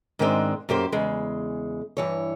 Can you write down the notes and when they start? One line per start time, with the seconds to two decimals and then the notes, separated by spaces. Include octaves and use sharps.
0.19 G#2 D#3 G#3 B3 C4 D4
0.69 F#2 A#3 G4 C5
0.92 E2 C#3 G#3
1.97 G2 E3 C#5